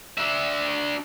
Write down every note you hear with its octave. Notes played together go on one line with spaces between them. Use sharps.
D4 E5